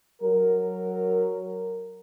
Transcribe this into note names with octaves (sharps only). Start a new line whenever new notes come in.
F#3 A#4